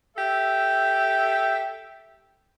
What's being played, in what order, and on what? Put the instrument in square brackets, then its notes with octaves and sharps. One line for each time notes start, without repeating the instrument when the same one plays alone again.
[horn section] G4 A4 E5